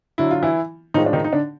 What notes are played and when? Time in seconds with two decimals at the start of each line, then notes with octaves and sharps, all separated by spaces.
0.18 D3 F#3 E4
0.31 F4
0.43 E3 E4
0.94 A2 D#3 F3 G#3 D#4
1.06 D4
1.13 D#3 D#4
1.24 D#4
1.33 D3 D4